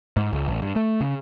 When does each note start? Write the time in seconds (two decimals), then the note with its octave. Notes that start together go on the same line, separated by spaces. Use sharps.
0.17 G#2
0.33 C#2
0.48 A1
0.62 G2
0.76 A3
1.01 C#3